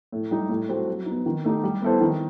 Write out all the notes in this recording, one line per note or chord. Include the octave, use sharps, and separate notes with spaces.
A2
G3 D#4
A2
G3 C4 F#4 A4
F#3
B3 D#4
D#3
A3 D#4 G4
G3
B3 E4 A4 C5
D#3